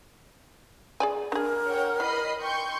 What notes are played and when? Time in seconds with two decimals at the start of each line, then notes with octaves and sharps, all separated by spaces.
1.00 G#4 D5 G#5
1.32 D4 G#4 A#4
1.66 C#5 F#5 G5
2.00 E3 D#5 B5 C7
2.42 G5 C6 C#6 G6